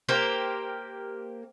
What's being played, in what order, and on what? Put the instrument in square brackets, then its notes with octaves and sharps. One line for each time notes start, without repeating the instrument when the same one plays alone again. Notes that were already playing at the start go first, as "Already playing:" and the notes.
[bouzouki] A#3 G4 A#4 C5